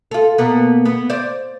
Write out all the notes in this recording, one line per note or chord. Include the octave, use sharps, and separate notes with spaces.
F4 A4
B2 A#3 B3
B3
C5 D5